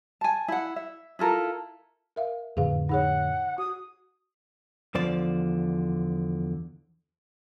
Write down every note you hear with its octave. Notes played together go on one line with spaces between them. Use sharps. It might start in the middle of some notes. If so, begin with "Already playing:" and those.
G#5 A5
E4 F#5
E5
E4 F4 A4 A#4
A#4 E5 F5
F2 A2 D3 G#4 B4 F5
D#4 G#4 C#5 F#5
F#4 D#6
E2 D3 F3 C5 D5